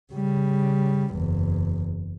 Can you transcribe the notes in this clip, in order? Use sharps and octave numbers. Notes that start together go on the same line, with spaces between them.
C#3 G3
F#1 E2